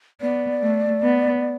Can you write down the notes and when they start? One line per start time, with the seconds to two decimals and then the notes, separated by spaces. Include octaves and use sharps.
0.21 B3 D5
0.62 A3
1.03 B3